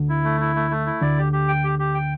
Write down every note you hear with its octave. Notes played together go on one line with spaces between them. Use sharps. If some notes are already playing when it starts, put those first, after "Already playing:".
Already playing: D2 D3
E4
A3
E4
A3
A3
E4
D2 D3 D5
G4
G4
G5
G4
G4
G5